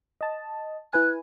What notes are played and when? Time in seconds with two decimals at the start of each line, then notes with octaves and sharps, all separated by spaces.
0.21 D#5 A5
0.93 E4 B4 G#5 F#6